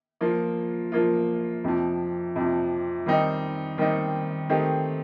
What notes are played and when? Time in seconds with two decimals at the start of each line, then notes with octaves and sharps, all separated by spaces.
0.21 F3 A#3 F4
0.92 F3 A#3 F4
1.64 F2 C3 F3
2.36 F2 C3 F3
3.06 D#3 G3 C4 D#4
3.78 D#3 G3 C4 D#4
4.49 D#3 A3 C4 D#4 G4